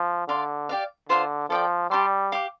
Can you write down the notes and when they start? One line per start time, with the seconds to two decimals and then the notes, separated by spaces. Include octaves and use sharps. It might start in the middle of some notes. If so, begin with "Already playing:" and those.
Already playing: F3
0.28 D3 D5 F5 C6
0.69 G4 D5 F5
1.09 D3 F4 C5 F5 C6
1.50 F3 A4 D5 G5
1.90 G3 G4 D5 A5 C6
2.32 G4 F5 D6